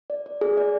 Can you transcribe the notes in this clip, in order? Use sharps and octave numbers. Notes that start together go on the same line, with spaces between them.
D5
D5
G#4
D5